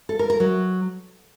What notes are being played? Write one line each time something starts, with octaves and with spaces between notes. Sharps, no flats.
A4
A#4
A#4
F#3